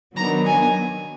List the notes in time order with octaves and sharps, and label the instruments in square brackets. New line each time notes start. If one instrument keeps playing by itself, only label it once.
[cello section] D#3 F#3 B3 D4 [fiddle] A#5
[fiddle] G#5